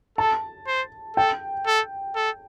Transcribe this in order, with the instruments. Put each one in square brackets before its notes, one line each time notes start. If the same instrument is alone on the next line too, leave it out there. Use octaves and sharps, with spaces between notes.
[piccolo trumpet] A4 [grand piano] A5
[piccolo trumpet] C5
[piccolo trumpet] A4 [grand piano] G5
[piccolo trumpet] A4
A4